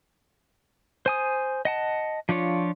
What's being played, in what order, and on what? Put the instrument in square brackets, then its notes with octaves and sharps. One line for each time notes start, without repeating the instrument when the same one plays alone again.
[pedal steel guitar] C5 G#5 D#6
D#5 F#5 A5
F3 D4 F4 C#5